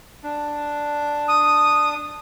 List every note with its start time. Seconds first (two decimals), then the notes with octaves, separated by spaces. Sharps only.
0.23 D4
1.28 D#6